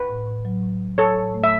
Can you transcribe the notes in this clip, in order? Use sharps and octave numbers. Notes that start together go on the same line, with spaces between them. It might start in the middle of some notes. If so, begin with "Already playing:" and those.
Already playing: B4
A2
A2
F#3
A2
A2
F#3 A4 C#5
A2
A3
E5